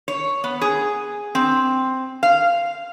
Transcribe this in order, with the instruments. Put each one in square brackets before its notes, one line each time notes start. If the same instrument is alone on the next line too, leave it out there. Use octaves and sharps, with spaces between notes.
[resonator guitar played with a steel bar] C#5
B3
G#4
C4
F5